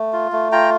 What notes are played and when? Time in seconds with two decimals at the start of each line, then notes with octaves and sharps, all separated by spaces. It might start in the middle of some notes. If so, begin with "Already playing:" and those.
Already playing: A3
0.13 F4
0.32 A3
0.52 F4 G5 A#5